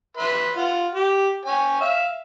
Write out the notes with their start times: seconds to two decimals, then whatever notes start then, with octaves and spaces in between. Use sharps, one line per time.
0.17 B4 E5 C6
0.57 F4 F#5
0.95 G4
1.45 C#5 G5 G#5
1.81 E5 F5